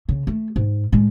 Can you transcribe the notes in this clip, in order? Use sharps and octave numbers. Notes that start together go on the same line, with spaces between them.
C#3
A3
G#2
A2 G#3